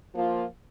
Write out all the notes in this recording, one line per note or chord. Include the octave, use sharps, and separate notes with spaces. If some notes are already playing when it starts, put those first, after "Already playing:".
F3 A#3 F4